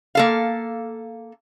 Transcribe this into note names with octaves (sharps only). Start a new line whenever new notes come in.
A#3 A4 F5